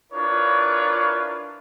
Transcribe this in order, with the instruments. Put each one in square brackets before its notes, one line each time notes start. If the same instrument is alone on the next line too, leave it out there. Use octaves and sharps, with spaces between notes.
[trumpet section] D4 E4 F4 A#4 B4 C#5